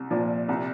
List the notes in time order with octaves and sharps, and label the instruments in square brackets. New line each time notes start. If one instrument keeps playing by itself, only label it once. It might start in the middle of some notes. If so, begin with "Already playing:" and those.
Already playing: [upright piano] C2
A#2 F3
C2